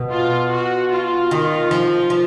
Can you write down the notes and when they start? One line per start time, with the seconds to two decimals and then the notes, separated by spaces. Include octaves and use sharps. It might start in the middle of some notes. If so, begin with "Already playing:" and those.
Already playing: B2
0.12 F4
0.52 F#4
0.92 F4
1.31 D#3
1.71 F3
2.10 F3